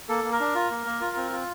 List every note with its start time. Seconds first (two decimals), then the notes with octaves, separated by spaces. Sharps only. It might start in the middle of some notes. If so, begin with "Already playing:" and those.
0.09 A#3 A4
0.24 A#3
0.32 A#4
0.40 D4
0.55 F4
0.71 A#3
0.86 A#3
1.01 F4
1.17 C4
1.32 F4